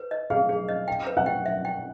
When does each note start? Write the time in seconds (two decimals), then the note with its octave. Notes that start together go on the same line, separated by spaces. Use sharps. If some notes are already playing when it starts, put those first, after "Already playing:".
Already playing: B4
0.11 D#5
0.30 G#4 F5
0.49 G#4
0.69 D#5
0.88 G5
1.07 B4
1.17 F#5
1.26 G5
1.46 E5
1.65 G5